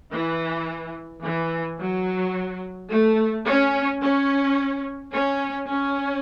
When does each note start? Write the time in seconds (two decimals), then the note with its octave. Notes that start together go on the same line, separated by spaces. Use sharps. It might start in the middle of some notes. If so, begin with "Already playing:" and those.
0.11 E3
1.23 E3
1.78 F#3
2.90 A3
3.46 C#4
4.02 C#4
5.13 C#4
5.69 C#4